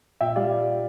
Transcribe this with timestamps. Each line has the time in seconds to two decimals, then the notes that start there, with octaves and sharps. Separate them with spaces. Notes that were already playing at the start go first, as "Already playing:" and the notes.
0.21 A#2 E5 G5
0.36 G3 D5 F5